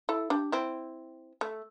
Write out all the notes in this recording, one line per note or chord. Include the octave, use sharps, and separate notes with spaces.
E4 A4
D4 G4
C4 E4
A3